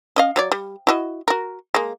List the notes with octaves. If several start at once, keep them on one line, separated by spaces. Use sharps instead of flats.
C#4 D#5 F5
F#3 C#5 D5
G3
E4 F#4 D#5
F#4 A#4
G#3 A#3